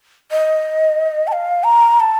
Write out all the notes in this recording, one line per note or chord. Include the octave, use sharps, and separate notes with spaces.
D#5
A5
F5
A#5
A5